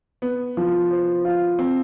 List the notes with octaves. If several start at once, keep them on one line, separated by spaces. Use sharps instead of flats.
B3
F3
C5
F4
C4